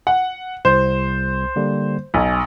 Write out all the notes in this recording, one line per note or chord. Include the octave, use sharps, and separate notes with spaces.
F#5
C2 C5
D3 G3 A#3
B1 G#5